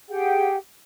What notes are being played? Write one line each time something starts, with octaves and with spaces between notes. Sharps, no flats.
G4 G#4 F#5 G5